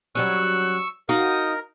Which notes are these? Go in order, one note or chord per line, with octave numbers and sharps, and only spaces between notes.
F#3 G3 C#4 C#6 E6 F#6
D#4 F#4 A#4 F5 D#6